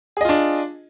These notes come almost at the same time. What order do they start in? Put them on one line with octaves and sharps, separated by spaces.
G#4 D#5 F4 D4